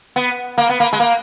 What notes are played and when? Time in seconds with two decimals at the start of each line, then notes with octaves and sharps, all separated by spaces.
0.16 B3
0.58 A#3
0.69 B3
0.80 A#3
0.93 G#3
1.00 A#3